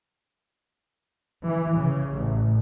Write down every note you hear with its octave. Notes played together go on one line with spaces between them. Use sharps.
E3
C#3
A1